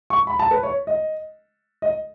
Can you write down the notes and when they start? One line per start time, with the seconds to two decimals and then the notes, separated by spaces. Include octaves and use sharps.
0.10 C#6
0.27 B5
0.39 A5
0.51 B4
0.63 C#5
0.87 D#5
1.82 D#5